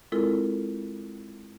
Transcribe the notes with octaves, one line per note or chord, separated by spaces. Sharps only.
G#3 C4 E4 F4 A4 A#4